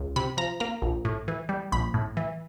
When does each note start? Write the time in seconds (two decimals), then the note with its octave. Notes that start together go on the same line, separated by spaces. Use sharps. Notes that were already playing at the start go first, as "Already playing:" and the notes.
Already playing: C#2
0.16 C3 B5
0.37 F3 A#5
0.60 A#3 A#5
0.82 A#1
1.05 A2
1.28 E3
1.49 G3
1.72 A#1 B5
1.94 A2
2.17 E3